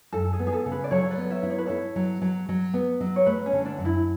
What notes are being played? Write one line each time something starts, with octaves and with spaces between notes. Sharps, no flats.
F#2 A4
G#4
B3
G#4
A4
C#3
B4
D5
F#3 A4 C#5
C#5
B4 D5
B3
C#5 E5
E4
C#5
B4
E4 A4 C#5
F#3
F#3
F#3
B3
F#3
C#5
A3 B4
C#4
D3
D4
F#2
E4